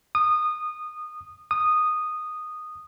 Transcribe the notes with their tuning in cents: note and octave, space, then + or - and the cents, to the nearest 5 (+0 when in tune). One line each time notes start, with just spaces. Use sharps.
D#6 -20
D#6 -10